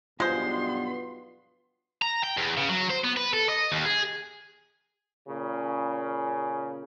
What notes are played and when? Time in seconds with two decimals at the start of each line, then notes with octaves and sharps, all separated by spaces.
0.20 B1 G2 G#3 B3 F4 C5 C6
2.02 A#5
2.23 G5
2.37 E2
2.57 C#3
2.70 F#3
2.90 C5
3.04 B3
3.17 B4
3.33 A4
3.49 D#5
3.72 D#2
3.86 G#4
5.29 A#2 C#3